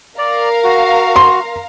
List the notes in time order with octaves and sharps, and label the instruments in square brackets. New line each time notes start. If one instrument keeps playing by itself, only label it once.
[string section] A#4 F5 A#5 [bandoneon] D5
[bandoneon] F#4
[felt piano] C6